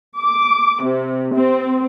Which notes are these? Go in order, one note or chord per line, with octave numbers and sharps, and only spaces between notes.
D6
C3
C4